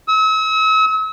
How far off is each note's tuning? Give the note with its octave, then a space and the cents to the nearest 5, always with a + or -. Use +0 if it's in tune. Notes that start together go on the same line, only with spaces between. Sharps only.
E6 -40